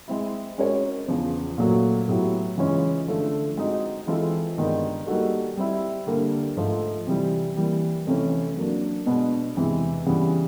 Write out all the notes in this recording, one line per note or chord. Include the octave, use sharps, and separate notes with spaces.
G#3 C4 E4
G#3 C#4 F#4 A#4 C#5
E2 C#3 F3
A#2 F#3 A3
A2 F#3 B3 E4 G4
C#3 E3 G#3 C#4 F4
D3 F3 A3
G#3 C4 D#4 F#4
E3 G#3 C4 F4 A4
G2 D#3 G#3 B3
G3 A#3 D#4 F#4 A4
G3 C4 E4
D3 G3 A#3
G#2 F3 A3
C3 E3 G3
E3 G3 A#3
F2 C3 E3 A3 C#4
F#3 A#3 D4
B2 G#3 B3 D4
E2 C3 E3 G#3
C#3 E3 G3 B3